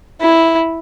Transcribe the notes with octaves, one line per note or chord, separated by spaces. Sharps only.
E4